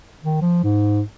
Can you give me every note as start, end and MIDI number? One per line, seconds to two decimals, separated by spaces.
0.24 0.39 51
0.42 0.62 53
0.64 1.01 44